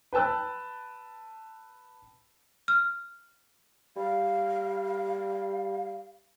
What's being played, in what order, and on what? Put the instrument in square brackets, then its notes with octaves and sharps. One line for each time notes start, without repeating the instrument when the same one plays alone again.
[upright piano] B4 G5 A5 E6 F#6
[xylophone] F6
[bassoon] G3 [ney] F5